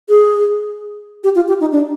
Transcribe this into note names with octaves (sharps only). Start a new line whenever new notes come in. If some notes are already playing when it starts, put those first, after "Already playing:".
G#4
G4
F4
G4
D#4
D4